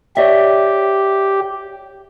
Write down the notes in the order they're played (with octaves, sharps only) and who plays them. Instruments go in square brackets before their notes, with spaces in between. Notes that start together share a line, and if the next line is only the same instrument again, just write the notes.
[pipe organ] G4 [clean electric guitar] C#5 D5 E5